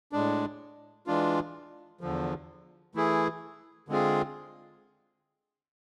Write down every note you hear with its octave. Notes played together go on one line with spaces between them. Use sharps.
A2 G#3 D4
E3 G#3 D4 F4
E2 D3 F3
E3 A3 E4 G#4
D3 G#3 C4 F4 G#4